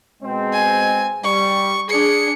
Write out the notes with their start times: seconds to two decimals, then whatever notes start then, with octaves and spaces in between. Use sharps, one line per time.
0.23 B2 G#3 C4
0.53 G#5
1.24 G3 C#6
1.89 D4 G#4 C#7